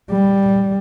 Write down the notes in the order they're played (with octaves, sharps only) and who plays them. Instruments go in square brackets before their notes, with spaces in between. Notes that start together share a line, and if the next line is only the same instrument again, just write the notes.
[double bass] G3